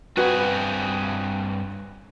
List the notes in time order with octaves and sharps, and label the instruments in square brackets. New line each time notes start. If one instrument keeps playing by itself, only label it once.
[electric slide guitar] G2 C4 G#4 [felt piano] F#4 B4